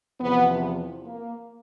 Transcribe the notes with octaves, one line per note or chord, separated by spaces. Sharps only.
E2 C3 F3 B3
A#3